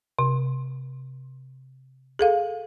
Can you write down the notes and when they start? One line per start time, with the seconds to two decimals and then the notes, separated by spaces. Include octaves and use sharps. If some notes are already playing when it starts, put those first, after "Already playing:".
0.19 C3
2.19 G#4 A4 F5